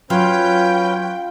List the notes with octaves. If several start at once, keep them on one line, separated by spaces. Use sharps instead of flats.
F#3 C#4 F4 B4 F5 G5 G6